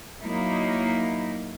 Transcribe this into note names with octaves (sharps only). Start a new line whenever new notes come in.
F#3 A#3 D#4 E4